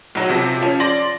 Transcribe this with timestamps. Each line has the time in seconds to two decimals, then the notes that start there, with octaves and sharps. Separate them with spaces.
0.15 B1 F#3
0.29 C3 F3
0.61 F3 C#4
0.80 D5 C6 A#6